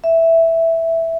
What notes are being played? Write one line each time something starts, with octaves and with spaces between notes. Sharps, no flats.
E5